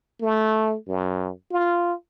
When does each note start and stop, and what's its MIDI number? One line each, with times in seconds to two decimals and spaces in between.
0.21 0.76 57
0.87 1.31 42
1.51 1.93 65